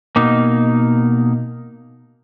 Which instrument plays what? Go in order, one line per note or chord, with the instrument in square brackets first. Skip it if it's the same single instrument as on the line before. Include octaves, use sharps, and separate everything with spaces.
[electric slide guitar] B2 A#3 D#4